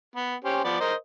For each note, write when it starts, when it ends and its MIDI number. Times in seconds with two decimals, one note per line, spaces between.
0.16 0.35 59
0.44 0.61 61
0.44 0.61 67
0.44 0.61 72
0.64 0.77 53
0.64 0.77 59
0.64 0.77 74
0.80 0.94 70
0.80 0.94 72
0.80 0.94 75